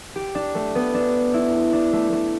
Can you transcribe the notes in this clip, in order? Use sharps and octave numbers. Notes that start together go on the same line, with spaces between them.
G4
D4
A3
B3
D4
E4
D4
A3
A3